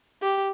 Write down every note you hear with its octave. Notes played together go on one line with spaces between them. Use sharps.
G4